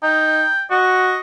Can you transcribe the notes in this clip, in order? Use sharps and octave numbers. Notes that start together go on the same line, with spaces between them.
D#4 G5
F#4 D#5